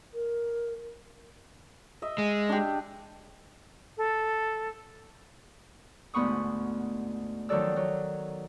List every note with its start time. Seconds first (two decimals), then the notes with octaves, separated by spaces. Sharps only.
0.14 A#4
2.02 D#5 E5
2.18 G#3
2.49 D4 G4
3.97 A4
6.14 D2 G#2 B3 B5 C#6 D#6
7.49 D#3 F3 F#3 A4 D5 E6
7.76 F#3